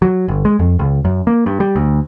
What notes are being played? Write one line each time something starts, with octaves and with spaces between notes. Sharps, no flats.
F#3
G1
G#3
F2
C#2
F#2
A#3
G2
G3
D2